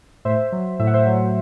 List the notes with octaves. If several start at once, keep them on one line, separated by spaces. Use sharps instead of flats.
A2 C5 E5
F#3
A2 E5
F#5
C5 E5
F#3